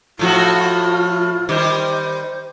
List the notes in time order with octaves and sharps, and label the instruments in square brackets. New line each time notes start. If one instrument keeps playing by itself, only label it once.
[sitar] A2 F3 F#4 [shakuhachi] F4
[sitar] D#3 G3 [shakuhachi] C5